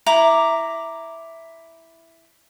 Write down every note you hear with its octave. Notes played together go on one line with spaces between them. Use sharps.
E4 A#5 D6